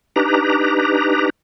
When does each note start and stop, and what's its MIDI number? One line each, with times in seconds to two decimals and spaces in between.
0.16 1.30 62
0.16 1.30 63
0.16 1.30 67
0.16 1.30 71
0.16 1.30 82